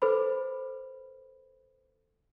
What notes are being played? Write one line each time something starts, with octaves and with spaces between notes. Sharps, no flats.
A4 B4 C5 B5